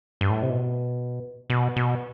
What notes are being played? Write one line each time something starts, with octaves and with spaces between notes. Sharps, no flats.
G2
A2
C3
B2
B2
B2